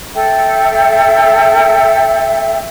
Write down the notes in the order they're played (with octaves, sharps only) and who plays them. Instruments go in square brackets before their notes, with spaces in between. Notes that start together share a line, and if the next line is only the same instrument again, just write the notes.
[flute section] A4 E5 G5